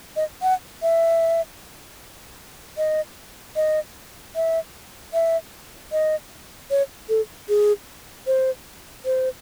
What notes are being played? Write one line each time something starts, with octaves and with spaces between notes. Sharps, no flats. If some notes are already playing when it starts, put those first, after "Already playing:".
D#5
F#5
E5
D#5
D#5
E5
E5
D#5
C#5
A4
G#4
C5
C5